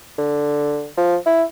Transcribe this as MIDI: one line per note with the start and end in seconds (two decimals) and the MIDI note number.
0.18 0.87 50
0.97 1.16 53
1.26 1.43 64